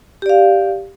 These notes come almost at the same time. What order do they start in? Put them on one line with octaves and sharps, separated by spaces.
G4 D5 F5